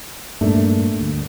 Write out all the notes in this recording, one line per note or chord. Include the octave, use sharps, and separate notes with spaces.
G2 A#2 A3 A#3 D4
D2